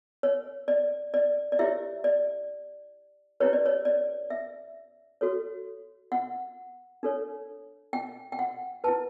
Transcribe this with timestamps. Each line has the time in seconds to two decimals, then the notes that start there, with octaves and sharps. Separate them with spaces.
0.23 C#5
0.68 D5
1.14 D5
1.52 D5
1.59 E4 G4 C#5 E5
2.04 D5
3.40 C#4 E4 G4 B4 C#5
3.53 D5
3.66 C#5
3.85 D5
4.30 E5
5.21 F#4 A4 C#5
6.12 F#5
7.03 D4 A4 C#5
7.93 G5
8.32 G5
8.39 F#5
8.84 E4 B4 A5